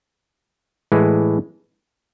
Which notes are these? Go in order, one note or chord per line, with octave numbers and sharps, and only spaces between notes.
A2 E3 G#3